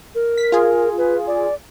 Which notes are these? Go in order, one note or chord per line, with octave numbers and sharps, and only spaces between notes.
A#4
B6
F4 G#4
B4
D5